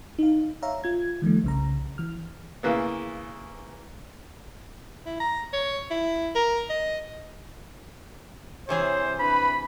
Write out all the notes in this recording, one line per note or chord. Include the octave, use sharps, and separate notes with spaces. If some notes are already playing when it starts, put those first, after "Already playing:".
D#4 F5
C#5 E5 F5 A#5
F4 G#6
D#3 F3 G3 A3
C2 C#3 A#5
E3 F6
C#3 E3 A#3 B3
E4
A#5
C#5
E4
A#4
D#5
C3 E3 G#4 C5 C#5
D4 B4 B5